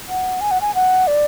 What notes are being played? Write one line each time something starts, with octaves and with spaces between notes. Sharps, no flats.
F#5
G#5
F#5
G#5
F#5
D5